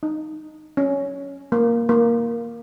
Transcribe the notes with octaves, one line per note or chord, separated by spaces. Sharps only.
D#4
C#4
A#3
A#3